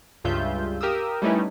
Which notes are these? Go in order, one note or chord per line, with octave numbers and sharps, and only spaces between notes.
C#2 G2 C#3 F4 E5 G6
G4 A#4 F5 D#6 E6
G3 A3 C#4 D#4 E4 B4